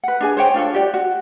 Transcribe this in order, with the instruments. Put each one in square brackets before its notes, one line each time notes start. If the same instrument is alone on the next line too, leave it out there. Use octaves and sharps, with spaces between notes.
[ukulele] B4 F#5
D4 G#4 G#5
C5 C#5 G5
D4 F4 A4 C#5
F#4 G4 D5
F#4